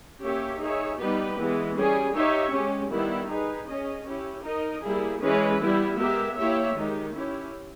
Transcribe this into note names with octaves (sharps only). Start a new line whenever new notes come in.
A#3 C#4 G4 C#5 E5
D#4 G#4 C#5 E5
G3 B3 D#4 G4 B4
E3 G#3 B3
G3 C#4 G#4
D#4 G4 C#5 E5
G#3 C#4 G4
D#3 G3 B3 E4
D#4 G#4 B4
C#4 G#4 D#5
C#4 E4 G4
D#4 A#4 D#5
G3 A#3 E4 G#4
E3 G#3 C#4 G#4 B4
G3 B3 E4
G#3 B3 G4 A#4 E5
A#3 E4 G4 C#5 E5
D#3 G#3 D#4 G4
C#4 E4 G4